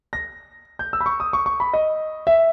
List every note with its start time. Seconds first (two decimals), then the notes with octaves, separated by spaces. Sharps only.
0.13 A#6
0.79 G6
0.93 E6
1.01 B5
1.06 C#6
1.20 D#6
1.33 C#6
1.46 C#6
1.60 B5
1.73 D#5
2.27 E5